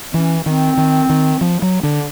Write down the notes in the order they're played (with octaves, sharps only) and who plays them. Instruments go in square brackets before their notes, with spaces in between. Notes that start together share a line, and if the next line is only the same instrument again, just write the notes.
[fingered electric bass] E3 [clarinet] C#4
[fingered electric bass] D#3 [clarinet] C4
[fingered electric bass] D#3
D#3
F3
F#3
D3